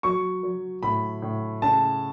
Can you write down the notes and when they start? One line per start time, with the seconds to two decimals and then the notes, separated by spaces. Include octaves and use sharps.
0.03 F#3 C#6
0.43 F#3
0.83 A2 B5
1.22 A2
1.62 C#3 A5